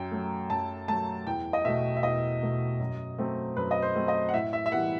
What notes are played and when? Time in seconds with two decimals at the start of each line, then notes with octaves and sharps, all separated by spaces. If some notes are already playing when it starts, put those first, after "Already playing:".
Already playing: F#2 G5
0.11 F#3 A3
0.50 F#2 A5
0.88 F#3 A3 A5
1.26 E2 G5
1.53 D#5
1.65 B2 A3 E5
1.97 E5
2.03 E2 D#5
2.42 B2 A3
2.80 F#2
3.18 F#3 A3 C4
3.56 F#2 B4
3.71 D#5
3.82 C5
3.95 F#3 A3 C4
4.08 D#5
4.29 F#5
4.33 A2 E5
4.53 E5
4.66 E5
4.72 E3 G3 B3 F#5